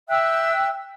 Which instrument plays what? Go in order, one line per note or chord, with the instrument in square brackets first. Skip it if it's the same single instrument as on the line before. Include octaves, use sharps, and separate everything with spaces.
[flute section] E5 G5 E6 F#6